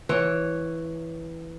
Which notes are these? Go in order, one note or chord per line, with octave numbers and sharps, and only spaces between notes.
E3 C#5